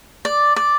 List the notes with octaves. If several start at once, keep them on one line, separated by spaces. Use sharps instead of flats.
D5
D5